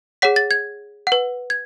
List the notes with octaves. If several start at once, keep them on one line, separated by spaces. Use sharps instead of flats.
G#4 C#5 F#5 B6
A6
G#6
B4 F#5
G#6